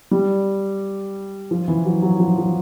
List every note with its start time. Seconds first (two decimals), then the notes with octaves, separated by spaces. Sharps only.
0.11 G3
1.51 F3
1.68 E3
1.85 F#3
2.02 F#3
2.20 F3
2.38 F3